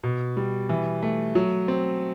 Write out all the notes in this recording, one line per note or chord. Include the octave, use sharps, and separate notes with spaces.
B2
G3
E3
A3
F#3
C4